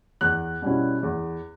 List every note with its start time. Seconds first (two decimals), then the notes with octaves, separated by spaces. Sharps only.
0.21 E2 F#6
0.62 B2 G3 C#4 E4
1.03 E2